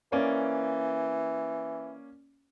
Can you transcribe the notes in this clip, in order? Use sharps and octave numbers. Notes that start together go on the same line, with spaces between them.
E3 A#3 C#4 D5